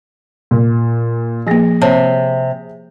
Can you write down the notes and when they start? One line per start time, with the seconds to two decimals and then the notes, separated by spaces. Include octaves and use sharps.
0.51 A#2
1.47 F3 A#3 G#4 A#6
1.82 C3 C#5 A5